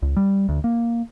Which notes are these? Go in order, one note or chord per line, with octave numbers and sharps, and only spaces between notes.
C#2
G3
D2
A#3